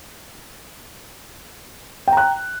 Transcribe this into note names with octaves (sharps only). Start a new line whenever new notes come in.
G5 A#5 F#6